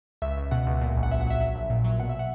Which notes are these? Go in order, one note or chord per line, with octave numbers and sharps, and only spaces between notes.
C#2 E5
C#2
B2 F#5
C#2
A#2
A#1
F#5
F#3 E5
F#5
F#3 E5
F#3 E5
A#1
A#2
F#3
B2 F#5
E5
F#5